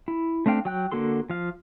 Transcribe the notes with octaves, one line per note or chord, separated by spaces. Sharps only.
E4
A3 C4 D4 F5 G5
F#3 G5 F#6
D3 A#3 F#4 A4 C6
F3 F5